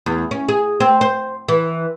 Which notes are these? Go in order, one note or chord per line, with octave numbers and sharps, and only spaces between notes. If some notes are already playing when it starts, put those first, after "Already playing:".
E2
C#4
G#4
C4
C5
E3